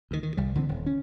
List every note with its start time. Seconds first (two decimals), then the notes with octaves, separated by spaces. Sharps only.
0.11 D2 D#3
0.23 D#3
0.37 C2 G3
0.55 D3 E3 A#3 C4
0.69 D#1
0.86 C#4